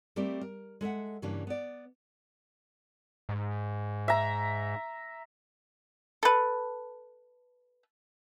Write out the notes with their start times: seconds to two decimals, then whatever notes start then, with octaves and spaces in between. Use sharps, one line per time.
0.16 G3 A3 C4 G4 A#4 D5
0.41 A#4
0.81 G#3 A4 E5 F#5
1.22 G2 C#3 E3 G3 A#3 D4
1.47 B3 D5
3.29 G#2
4.08 E5 A#5
6.23 A4 B4